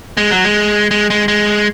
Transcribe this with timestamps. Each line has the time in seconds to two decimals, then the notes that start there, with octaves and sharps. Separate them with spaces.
0.17 G#3
0.31 F#3
0.44 G#3
0.91 G#3
1.10 G#3
1.28 G#3